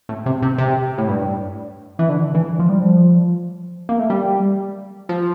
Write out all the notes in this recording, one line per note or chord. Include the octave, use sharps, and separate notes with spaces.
A2
C3
C3
C3
A2
G2
E3
D3
E3
F3
G3
F3
A#3
A3
G3
F3